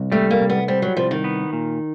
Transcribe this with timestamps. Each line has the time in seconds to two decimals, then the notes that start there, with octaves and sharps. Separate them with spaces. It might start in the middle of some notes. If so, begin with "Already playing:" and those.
Already playing: C2
0.12 G3 A3
0.31 A#3
0.40 C2
0.50 B3
0.68 G3 C4
0.82 F#3
0.97 C2 F3
1.11 D#3
1.24 B3
1.53 A#2